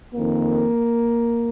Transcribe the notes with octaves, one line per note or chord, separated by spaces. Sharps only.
F2 D#3 A#3